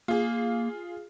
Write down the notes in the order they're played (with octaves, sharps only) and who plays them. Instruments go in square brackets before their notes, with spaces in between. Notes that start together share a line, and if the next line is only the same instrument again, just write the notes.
[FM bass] A#3 [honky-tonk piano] F4 G#4